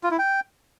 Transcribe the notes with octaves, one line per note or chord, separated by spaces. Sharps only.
F4
E4
G5